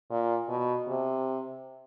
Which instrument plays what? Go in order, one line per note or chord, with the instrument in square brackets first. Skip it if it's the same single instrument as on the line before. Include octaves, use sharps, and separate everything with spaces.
[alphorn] A#2
B2
C3